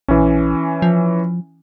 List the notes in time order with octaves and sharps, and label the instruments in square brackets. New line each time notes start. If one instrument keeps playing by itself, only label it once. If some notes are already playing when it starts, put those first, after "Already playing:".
[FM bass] A#1 [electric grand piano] E3 C#4
[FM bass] F3